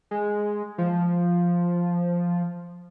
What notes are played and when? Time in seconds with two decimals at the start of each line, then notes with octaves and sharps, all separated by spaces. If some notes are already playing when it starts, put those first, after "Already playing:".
0.11 G#3
0.78 F3